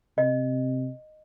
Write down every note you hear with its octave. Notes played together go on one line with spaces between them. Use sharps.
C3 D#5